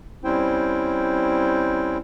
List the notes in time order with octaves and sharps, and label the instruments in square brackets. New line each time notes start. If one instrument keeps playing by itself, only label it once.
[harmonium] G3 C4 C#4 E4 C5 G5